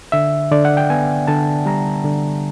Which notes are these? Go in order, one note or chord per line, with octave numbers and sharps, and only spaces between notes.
D3 E5
D3 D5
F#5
G5
B3 G#5
D3 A5
G3 A#5
D3